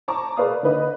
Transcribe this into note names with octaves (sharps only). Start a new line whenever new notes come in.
C5 A5 A#5 C#6 D6
G#4 A#4 B4 D5 F5 D#6
D3 D#4 B4 D#5